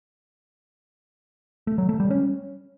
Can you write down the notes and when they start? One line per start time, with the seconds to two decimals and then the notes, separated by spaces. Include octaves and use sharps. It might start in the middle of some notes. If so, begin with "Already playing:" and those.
1.67 A3
1.78 F#3
1.89 A3
2.00 G3
2.10 C#4